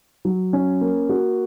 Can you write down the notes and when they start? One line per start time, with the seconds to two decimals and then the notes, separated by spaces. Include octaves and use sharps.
0.25 F#3
0.53 C#4
0.81 A#3
1.09 F#4